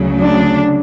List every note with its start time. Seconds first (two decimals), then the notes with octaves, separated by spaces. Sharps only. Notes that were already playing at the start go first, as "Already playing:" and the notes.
Already playing: D2 C#3 F#3
0.20 D4